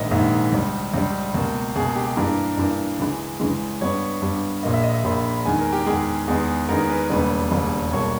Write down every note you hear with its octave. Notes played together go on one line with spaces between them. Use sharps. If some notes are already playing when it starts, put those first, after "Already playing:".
Already playing: A#1 G#2 D#3 A#3 D#5 E5
A#1 G#2 D#3 A#3 E5
C#2 C#3 G3
C#2 C#3 G3
C#2 B2 A#3
C#2 B2 A#3 G#4
G4
G2 E3 A#3 A#4
G2 E3 A#3
C#2 C#3 E3 G#3
C#2 C#3 E3 G#3
G2 G3 B3 C#5
G2 G3 B3
A#1 A#2 A#3 D#5
E5
D#5
E5
A#1 A#2 A#3 B5
B5
E2 D#3 G#3 G#5
A#4
G4
E2 D#3 G#3 G#4
E2 D#3 G#3 B3
E2 D#3 G#3 B3 A#4
B4
E1 D#2 C#3 G3 B4
E1 D#2 C#3 G3
B1 B2 G3 A#3 C#5